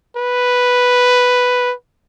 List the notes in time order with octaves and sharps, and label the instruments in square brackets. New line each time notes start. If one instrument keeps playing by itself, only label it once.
[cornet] B4